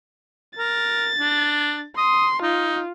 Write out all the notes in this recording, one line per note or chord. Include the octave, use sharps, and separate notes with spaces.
A#4 A6
D4
C6 D#6
D#4 F4